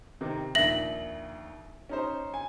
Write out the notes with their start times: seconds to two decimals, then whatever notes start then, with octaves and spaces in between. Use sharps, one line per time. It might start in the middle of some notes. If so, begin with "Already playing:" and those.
0.21 C3 D#3
0.55 A#1 D#2 E5 A#6 F#7
1.89 C#4 D#4 C5
2.34 G#5